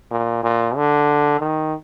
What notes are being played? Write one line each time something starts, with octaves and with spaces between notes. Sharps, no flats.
A#2
A#2
D3
D#3